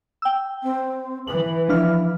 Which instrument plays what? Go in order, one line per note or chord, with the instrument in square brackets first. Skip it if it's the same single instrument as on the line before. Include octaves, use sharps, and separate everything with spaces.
[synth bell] G5 E6
[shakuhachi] C4
[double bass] E3 [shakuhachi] B4 [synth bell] F#7
[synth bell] F3 D4 F6 [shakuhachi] E4